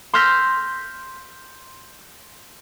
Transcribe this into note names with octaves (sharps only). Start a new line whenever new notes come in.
C6 E6 F6 G6 A#6 B6